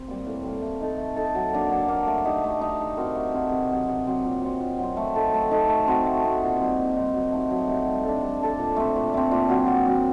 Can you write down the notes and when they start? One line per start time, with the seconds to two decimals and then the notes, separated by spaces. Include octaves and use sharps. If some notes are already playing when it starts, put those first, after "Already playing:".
Already playing: C4
0.08 G3 A#3
0.26 A2
0.44 G3 A#3
0.62 A3
0.81 D#4 A4
0.98 A3
1.16 D#4 A4
1.35 F#3
1.53 A#3 D4
1.70 F#3
1.88 A#3 D4
2.07 A3
2.25 D#4 G4
2.44 A3
2.61 D#4 G4
2.79 A3
2.97 C4 F#4 A#4
3.15 A3
3.34 C4 F#4 A#4
3.51 C3
3.71 F#3 C4 G4
3.88 C3
4.07 F#3 C4 G4
4.24 A#2
4.42 F#3 C4
4.60 A#2
4.78 F#3 C4
4.97 A3
5.15 D#4 A4
5.34 A3
5.51 D#4 A4
5.69 A3
5.87 C4 F#4
6.06 A3
6.24 C4 F#4
6.41 A#2
6.60 G3 C4 D#4
6.78 A#2
6.95 G3 C4 D#4
7.14 F#3
7.32 A3 D#4 G4
7.50 F#3
7.68 A3 D#4 G4
7.86 G3
8.04 D4 A4
8.22 G3
8.41 D4 A4
8.59 A#2
8.76 A3 C4
8.96 A#2
9.14 A3 C4
9.31 A#2
9.49 F#3 C4 F#4
9.67 A#2
9.86 F#3 C4 F#4